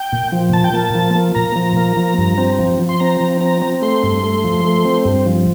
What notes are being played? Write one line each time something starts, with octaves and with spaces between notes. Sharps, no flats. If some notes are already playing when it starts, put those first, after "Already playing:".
Already playing: G5
A#2
F3
A#2 A5
G5
A#3 A5
F3
A#3
A#2 A#5
F3
A#3
F3
G2
C4
F3
F3
C6
C4 A#5
F3
C4 A#5
C4
A3 C6
G2
A3
F3
A3
C4
G2
F3